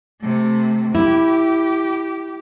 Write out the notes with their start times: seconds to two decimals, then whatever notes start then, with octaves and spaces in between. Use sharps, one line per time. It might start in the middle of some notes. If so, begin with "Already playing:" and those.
0.21 C3 A3
0.95 E4 G4